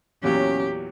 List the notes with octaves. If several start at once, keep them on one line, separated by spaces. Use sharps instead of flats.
E2 A#2 F#3 C#4 G4